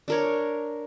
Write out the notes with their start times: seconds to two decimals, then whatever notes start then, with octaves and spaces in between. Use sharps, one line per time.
0.08 D4 A#4 C#5